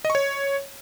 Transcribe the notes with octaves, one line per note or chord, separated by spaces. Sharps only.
D#5
C#6
C#5